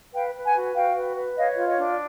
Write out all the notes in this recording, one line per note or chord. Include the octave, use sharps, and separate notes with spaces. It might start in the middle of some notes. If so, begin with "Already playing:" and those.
B4 F5 G5
B4
F#5 G#5
F#4
F#4 F5 G5
B4
B4
C#5 D#5 F5
F4
C#5 D#5
D4
D5